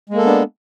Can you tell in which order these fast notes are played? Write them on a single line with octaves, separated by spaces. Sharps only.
G#3 A#3 A4 B3 D4